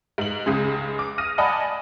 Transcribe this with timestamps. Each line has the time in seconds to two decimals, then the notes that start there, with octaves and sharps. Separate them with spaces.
0.18 G#2 F#7
0.46 C#2 C#3 G#3
0.99 D6
1.18 D#6 F6 A#6 D#7
1.38 D5 D#5 F#5 G#5 A5 B5